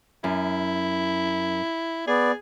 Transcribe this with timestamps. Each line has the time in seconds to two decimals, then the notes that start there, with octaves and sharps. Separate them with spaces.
0.24 F#2 E4
2.07 B3 G#4 D5